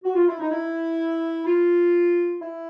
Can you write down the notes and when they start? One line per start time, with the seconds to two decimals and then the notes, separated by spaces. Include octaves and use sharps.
0.04 F#4
0.15 F4
0.27 E4
0.39 D#4
0.51 E4
1.46 F4
2.40 E4